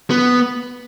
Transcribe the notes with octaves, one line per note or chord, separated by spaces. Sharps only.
B3